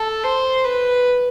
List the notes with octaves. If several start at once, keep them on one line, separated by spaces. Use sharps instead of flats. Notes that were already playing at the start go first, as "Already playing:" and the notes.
Already playing: A4
C5
B4